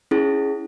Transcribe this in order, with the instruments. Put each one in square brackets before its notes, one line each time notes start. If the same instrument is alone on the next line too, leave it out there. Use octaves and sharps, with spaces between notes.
[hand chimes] C#4 E4 G#4